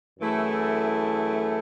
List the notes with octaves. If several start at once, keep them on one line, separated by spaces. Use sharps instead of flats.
F#2 E3 A3 E4 G#4